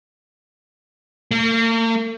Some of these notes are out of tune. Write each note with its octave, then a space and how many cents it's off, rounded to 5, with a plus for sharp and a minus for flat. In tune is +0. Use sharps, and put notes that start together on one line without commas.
A#3 -45